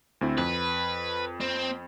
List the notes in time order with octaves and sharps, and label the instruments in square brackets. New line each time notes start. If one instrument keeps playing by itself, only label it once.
[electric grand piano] D2 C4 E4
[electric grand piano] F2 [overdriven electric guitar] B4
[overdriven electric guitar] C4